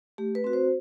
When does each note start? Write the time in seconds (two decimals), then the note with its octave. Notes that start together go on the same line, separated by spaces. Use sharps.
0.18 A3 G4
0.35 B4
0.44 C4 F#4
0.53 C5